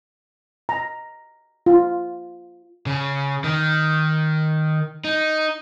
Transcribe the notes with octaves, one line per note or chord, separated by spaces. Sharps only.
A#5
F4
C#3
D#3
D#4